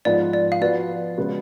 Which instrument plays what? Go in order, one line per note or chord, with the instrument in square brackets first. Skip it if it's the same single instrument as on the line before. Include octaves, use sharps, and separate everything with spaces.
[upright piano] G#2 F3 B3 F4 B4 [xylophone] D5
[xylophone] D5
F5
[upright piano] F3 B3 F#4 B4 [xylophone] D5
[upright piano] C#3 G#3 B3 F#4